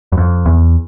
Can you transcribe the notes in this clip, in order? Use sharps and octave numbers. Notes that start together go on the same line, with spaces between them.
F#2
F2
E2